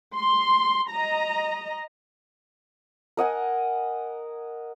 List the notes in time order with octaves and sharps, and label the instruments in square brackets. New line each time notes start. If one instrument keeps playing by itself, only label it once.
[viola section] C6
D#5 A#5
[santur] A#4 D#5 F#5 G#5